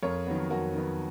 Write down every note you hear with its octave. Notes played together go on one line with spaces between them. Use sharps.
F2 A#4 C#5
D#3 F#3 B3
F2 F#4 A#4
D#3 F#3 B3